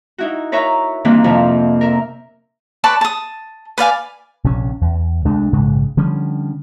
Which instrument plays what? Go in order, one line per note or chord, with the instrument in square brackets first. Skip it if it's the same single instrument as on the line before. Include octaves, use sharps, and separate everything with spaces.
[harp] D#4 E4 F#4
A#4 B4 C#5 E5 A#5
G2 D#3 E3 A#3 C4 D4
F2 C3 F3
A#4 E5
[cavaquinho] B4 D5 A5 C#6
A5 D#6
B4 D5 F5 G#5
[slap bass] A#1 C3 C#4
E2
C2 G#3 A3 D4
A#1 G#2 C#3 G#3
D3 F3 G3 C#4